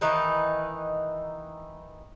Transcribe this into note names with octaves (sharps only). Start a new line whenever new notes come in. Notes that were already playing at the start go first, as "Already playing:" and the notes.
D#3 E3 D#4 B4